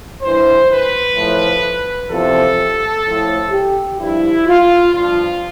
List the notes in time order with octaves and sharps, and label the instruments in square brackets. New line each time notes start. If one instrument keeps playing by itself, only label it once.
[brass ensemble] G2 E3 C5
B4
A2 F3
E2 C3 F3 A4
A2 F3
G4
G2 F3 E4
F4
G2 F3 F4